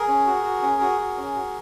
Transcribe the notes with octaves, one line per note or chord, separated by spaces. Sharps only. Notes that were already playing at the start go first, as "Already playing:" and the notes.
Already playing: G#4 A#4
C#4
F#4
F#4
C#4
F#4
F#4
C#4
F#4